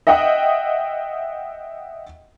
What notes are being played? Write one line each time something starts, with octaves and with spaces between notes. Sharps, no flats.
D#5 E5 F#5 G5 D#6